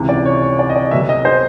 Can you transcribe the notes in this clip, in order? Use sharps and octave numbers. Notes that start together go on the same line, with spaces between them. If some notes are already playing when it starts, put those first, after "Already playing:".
Already playing: C#2 C3 E3
D5
C#5
C#5
D5
D#5
D5
C2 B2 F#3 E5
D#5
C5